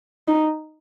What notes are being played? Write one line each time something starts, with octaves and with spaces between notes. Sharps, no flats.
D#4